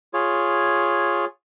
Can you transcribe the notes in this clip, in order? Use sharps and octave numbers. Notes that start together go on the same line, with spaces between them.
F4 G#4 C#5